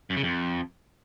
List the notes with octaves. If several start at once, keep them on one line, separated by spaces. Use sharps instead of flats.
F#2
C#3
F2